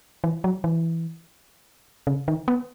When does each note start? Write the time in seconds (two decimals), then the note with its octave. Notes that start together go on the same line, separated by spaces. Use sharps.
0.24 E3
0.44 F#3
0.64 E3
2.07 C#3
2.28 D#3
2.48 B3